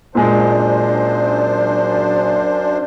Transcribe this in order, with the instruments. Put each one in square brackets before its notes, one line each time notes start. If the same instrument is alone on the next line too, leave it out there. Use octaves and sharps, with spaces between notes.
[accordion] F#2 D4 C5 [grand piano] A#2 G#3